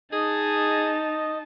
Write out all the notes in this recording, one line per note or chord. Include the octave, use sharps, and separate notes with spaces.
D#4 G#4 D#5 A5